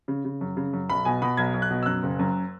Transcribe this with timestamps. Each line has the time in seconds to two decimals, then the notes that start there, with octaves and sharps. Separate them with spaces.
0.08 C#3
0.25 C#3
0.41 F#2
0.57 C#3
0.73 F#2
0.89 B1 B5
1.05 B2 G#5
1.22 B2 B5
1.37 B1 G#6
1.54 B1
1.62 F#6
1.71 B2
1.83 E6
1.86 F#2 F#6
2.03 F#1
2.19 F#2